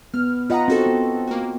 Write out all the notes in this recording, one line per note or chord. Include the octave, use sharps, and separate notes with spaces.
B3 F6
F4 B4 D#5 F#5 A#5
C4 D#4 F#4 A4
B3
A#3 F#4